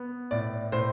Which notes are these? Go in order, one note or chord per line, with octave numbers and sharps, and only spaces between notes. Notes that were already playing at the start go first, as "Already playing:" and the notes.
Already playing: B3
A2 D5
A2 C5